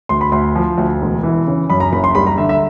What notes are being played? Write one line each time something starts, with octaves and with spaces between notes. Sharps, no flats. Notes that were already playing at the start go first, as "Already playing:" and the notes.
D2 C6
B5
D2 C6
F3
D2
E1
E3
C#3
F#2 B5
A#5
F#1 B5
C6
G3 B5
A#5
D3 E5
E5